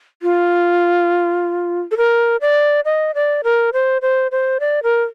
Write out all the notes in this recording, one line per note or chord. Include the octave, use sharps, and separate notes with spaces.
F4
A4
A#4
D5
D#5
D5
A#4
C5
C5
C5
D5
A#4